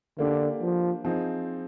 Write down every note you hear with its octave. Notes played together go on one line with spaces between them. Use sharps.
D3 A#3 D4 G4
F3
F3 C4 D#4 G#4